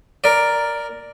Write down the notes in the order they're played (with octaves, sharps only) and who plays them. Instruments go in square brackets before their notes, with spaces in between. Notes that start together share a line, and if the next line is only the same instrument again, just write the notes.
[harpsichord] A#4 D5